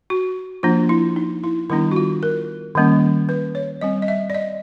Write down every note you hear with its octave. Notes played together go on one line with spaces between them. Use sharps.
F#4
F3 A#3 D4 F4
E4
D#4
E4
D#3 G3 B3 D4 E4
F#4
F4
A#4
D#3 G3 A#3 C#4
B4
C#5
G3 C4 D#5
D#5
E5
D5
D#5